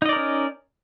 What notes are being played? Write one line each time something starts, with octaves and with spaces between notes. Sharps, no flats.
C#4 D#4 A#4 D5 D#5